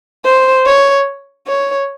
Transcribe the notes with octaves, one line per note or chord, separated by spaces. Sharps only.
C5
C#5
C#5